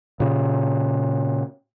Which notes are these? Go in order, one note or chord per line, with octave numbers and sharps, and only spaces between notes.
A#2 C#3